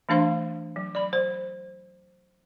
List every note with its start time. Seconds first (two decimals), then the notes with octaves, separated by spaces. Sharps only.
0.09 E3 A3 D4 C5 F5 C6
0.76 F#3
0.95 D5 B5
1.13 C5